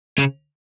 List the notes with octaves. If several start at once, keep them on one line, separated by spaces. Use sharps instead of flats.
C#3